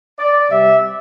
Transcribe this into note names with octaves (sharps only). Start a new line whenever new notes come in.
D5
C3 G3 E5